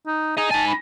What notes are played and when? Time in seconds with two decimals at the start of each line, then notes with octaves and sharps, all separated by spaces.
0.07 D#4
0.37 G#4 D#5 A#5
0.51 D#4 G#5 A5
0.68 B5